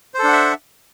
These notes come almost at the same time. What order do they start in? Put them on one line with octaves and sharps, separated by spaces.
C5 A4 D4 F#5 E5